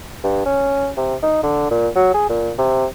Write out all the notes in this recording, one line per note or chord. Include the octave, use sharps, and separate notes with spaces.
G2
C#4
C3
D#4
D3
A#2
F#3
G#4
A#2
C3